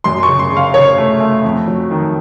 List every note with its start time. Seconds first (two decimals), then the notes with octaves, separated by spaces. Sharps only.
0.04 F#2 C6
0.23 C#6
0.28 C#3
0.39 C6
0.52 C#3 F5
0.74 C#3 C#5
0.98 A3
1.20 A3
1.45 F2
1.68 F#3
1.91 D#3